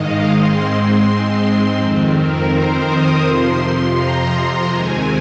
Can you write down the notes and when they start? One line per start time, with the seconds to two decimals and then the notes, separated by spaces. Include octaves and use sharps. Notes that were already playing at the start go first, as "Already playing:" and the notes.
Already playing: G#2 D#3 G#3 D#5 F5
0.26 G#2 G#3 C4 C6
1.73 F2 D#3 C4
2.09 A#4
2.46 C5
2.82 D#6
3.19 F2 C3 F3 C6
3.92 A#5
4.64 D#2 D#3 G#3 C4 G#5